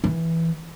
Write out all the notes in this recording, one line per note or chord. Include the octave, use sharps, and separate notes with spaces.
E3